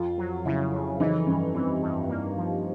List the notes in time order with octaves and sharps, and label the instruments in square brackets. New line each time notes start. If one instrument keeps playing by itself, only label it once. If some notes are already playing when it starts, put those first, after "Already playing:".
Already playing: [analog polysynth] F2 [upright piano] F4
[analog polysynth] F#3
[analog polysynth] C#3 [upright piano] E4
[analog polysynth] F2
[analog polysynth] E3 [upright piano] D#4
[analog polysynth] G2 [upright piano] C#4
[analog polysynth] E3 [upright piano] C4
[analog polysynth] G2
A#3
F3